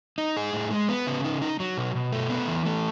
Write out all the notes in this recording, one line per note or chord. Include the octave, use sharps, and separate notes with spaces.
D#4
G#4
A2
G#3
B3
C#3
D#4
D#4
F#3
B2
B2
A3
B3
E3
A3